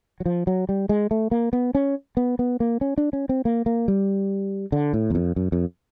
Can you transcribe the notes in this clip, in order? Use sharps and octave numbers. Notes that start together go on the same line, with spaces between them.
F#3
F3
F#3
G3
G#3
A3
A#3
B3
C#4
B3
B3
A#3
C#4
D4
C#4
C4
A#3
A#3
G3
D3
A2
E2
F2
F#2
F2